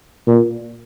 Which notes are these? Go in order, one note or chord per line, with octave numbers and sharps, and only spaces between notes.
A#2